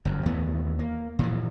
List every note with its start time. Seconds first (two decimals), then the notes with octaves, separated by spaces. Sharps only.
0.05 G1 F#2
0.26 D#2 E3 A3 B3
0.79 A#3
1.19 A#2 E3 F3